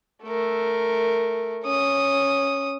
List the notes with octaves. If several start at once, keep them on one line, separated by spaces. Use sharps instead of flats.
A3 A#4
C#4 D#6